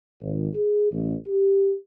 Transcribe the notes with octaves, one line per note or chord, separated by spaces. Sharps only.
G#1
G#4
A1
G4